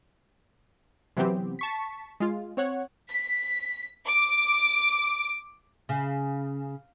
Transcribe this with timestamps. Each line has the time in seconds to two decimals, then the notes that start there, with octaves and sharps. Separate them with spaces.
1.17 C3 E3 F#3 B3 C4 G4
1.59 A5 C#6 B6
2.20 G#3 F4
2.57 C4 C#5 F#5
3.09 B6
4.06 D6
5.89 C#3